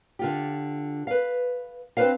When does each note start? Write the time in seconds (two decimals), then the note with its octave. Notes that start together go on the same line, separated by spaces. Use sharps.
0.19 D3 F4 G4
1.07 B4 F5
1.97 C4 D4 E4 B4 C5 F5